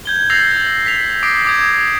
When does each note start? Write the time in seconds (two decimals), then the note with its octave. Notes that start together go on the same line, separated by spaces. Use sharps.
0.06 G6 G#6 G7
0.30 E6 G6 A6 A#6 C7 F7
0.86 B6 F7
1.23 D6 D#6 A#6 C7 D7
1.45 D6 D#6 G#6